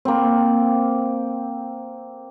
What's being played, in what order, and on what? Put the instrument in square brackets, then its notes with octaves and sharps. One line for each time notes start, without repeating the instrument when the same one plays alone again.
[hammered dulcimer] A#3 C4